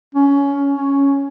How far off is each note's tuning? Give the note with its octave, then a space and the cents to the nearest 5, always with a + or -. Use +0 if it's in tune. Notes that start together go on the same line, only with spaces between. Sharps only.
C#4 +15
C#4 +0